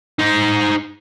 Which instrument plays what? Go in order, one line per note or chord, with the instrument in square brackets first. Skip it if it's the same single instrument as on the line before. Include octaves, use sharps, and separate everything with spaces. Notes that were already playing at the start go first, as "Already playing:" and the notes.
[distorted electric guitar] D#4 C5